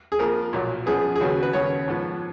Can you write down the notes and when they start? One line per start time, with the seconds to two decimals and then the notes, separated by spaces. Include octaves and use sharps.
0.12 G#4
0.19 F2 F3 A#3 A#4
0.53 B1 A#2 F#3
0.86 F#2 F3 B3 G#4
1.16 G#4
1.20 D#2 C#3 F#3 B3 F#4
1.43 B4
1.53 D#2 C#3 F#3 B3 C#5
1.88 G#2 F3 B3